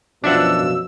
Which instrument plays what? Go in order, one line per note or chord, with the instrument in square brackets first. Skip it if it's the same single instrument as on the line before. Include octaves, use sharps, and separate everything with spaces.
[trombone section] F#2 B2 F3 [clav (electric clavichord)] D4 E5 F#5 [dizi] E6